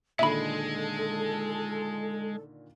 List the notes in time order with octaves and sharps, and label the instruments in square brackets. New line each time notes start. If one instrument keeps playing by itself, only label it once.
[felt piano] A#2 D3 D#3 [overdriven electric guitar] G#3 [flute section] A4 [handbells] E5 B5